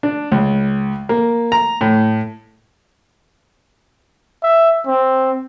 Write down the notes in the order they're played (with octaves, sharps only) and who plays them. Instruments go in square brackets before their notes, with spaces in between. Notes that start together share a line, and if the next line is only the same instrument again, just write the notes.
[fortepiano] D4
C#2
A#3
A#5
A2
[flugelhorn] E5
C4